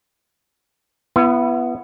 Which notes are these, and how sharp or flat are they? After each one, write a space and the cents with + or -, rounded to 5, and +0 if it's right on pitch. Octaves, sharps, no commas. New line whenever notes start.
B3 +0 E4 +35